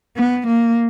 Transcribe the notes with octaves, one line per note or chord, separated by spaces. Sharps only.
B3
A#3